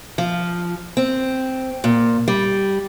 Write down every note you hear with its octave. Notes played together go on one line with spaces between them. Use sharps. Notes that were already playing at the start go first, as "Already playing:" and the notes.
F3
C4
A#2
G3